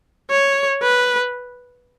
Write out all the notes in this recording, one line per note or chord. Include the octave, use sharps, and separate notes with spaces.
C#5
B4